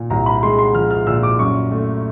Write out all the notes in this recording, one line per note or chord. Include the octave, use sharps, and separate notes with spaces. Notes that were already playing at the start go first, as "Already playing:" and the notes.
Already playing: A#2
C2 A#5
B5
G#3 C6
C6
F3 F6
F6
A#2 E6
D6
F#2 C#6
A3